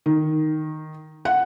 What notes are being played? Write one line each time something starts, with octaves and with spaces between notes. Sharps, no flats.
D#3
F#5